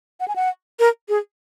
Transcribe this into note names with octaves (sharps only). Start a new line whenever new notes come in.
F#5
G#5
F#5
A#4
G#4